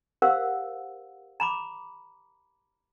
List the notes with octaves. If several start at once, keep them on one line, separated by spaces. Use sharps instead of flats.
G4 A#4 C5 F5 F#5 E6
A#5 B5 D6